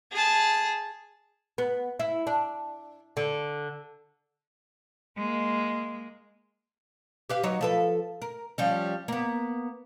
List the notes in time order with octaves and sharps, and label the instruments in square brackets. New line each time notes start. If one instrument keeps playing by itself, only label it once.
[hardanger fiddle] G#4 A5
[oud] B3
E4
D4
D3
[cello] G#3 A#3
[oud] G4 B4 F5
F#3 D#4 C#5
F3 A4 B4
A#4
F3 G3 C#4
A#3 B3